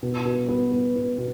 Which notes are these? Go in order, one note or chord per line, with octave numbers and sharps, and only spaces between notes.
B2
B2
B3
B3
B3
B2